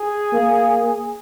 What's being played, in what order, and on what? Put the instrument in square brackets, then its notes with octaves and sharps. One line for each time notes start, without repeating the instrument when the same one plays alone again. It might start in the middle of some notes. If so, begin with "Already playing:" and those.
Already playing: [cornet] G#4
[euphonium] A#3